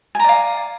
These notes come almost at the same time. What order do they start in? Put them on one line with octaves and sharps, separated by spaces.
G#5 A#5 D5 F5